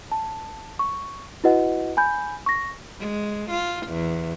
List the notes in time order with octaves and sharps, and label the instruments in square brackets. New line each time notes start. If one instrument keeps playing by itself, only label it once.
[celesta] A5
C#6
E4 F#4 B4 D#5 F#5
G#5 B5 G6
C#6 A#6
[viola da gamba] G#3
F4
E2